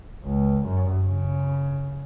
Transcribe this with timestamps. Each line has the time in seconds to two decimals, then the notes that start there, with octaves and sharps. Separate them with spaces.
0.25 C#2
0.66 F#2
1.06 C#3